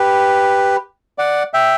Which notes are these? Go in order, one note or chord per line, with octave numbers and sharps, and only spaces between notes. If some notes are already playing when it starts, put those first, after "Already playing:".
Already playing: G4 B4
D5 F#5
E5 G5